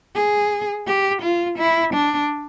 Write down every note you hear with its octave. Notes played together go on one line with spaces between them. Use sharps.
G#4
G4
F4
E4
D4